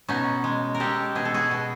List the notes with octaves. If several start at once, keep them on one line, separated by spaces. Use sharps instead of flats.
B2 C#4 D#4
G#3
A#4
G#3 G4 A4
B2 G#4
A4
F#4 G#4
B2